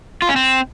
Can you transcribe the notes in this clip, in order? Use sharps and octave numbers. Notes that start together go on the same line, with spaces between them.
F4
C#4
C4